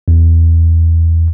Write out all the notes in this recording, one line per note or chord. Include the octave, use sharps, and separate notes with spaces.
E2